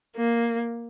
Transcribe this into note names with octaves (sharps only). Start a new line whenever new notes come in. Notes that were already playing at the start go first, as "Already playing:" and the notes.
A#3